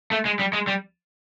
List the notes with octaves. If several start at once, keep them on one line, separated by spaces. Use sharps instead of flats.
A3
G#3
G3
G#3
G3